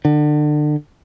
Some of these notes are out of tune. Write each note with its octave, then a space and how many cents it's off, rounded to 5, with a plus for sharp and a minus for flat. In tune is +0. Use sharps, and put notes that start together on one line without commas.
D3 +30